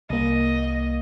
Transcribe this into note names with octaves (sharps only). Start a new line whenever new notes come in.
C2 A#3 D#5